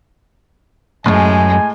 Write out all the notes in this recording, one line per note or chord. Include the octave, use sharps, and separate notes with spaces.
B1 F#2 A2 G#3 G#5